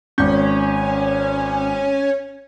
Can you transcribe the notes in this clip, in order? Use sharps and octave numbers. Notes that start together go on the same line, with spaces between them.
G#1 C#4 G6